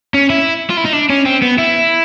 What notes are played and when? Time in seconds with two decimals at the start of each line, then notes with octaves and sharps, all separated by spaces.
0.14 C#4
0.30 E4
0.70 F4
0.77 E4
0.85 D#4
0.93 D4
1.10 C#4
1.26 C4
1.42 B3
1.58 E4